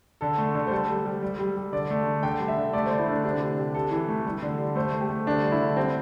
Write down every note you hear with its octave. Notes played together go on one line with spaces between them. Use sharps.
D3 A4
A3
D3
C5
G3 A4
G3
G3
G3
G3
G3
D3 D5
A3
D3
D3 G5
G3
E5
D3
A3 D5
A3 C5
E4
D3 D4
C3 D4
C3
C3
C3 A4
E3
A3
G3
D3
G3
A3 C5
A3
G4
A3
D3 D4
G3
E4
D3
G3 C4